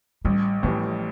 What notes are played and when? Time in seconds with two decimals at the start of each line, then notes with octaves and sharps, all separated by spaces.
0.25 A1 G3
0.63 A2 E3 F3 G3